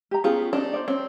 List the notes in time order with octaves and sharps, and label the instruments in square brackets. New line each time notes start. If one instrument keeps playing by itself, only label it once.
[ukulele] G4 A#5
[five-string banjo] B3 F4 [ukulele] C#4 G4 G#4
[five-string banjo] D4 D#4
[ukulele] C5 D5
[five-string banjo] C4 [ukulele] C#5